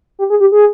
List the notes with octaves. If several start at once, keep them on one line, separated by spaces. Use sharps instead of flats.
G4
G#4
G4
G#4